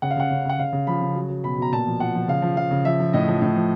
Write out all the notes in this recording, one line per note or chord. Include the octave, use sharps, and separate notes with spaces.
C#3 F#5
F5
C#3 F#5
C#3
C#3 F#5
C#3 F5
C#3
F3 B5
C#3
F#3
F#3
B2 B5
B2 A#5
A#2 A5
F3
F3 F#5
F3
C#3 F5
F3
F3 F5
C#3
F3 E5
F3
A2 D#5
F3
A2
F3